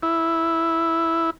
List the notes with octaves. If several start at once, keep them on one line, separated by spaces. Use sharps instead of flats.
E4